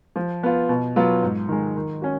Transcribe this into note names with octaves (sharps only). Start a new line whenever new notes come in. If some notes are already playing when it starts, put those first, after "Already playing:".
F3
B3 F4
B2
F#3 B3 F4
G#2
D#3 G#3
D#3
C#4 F#4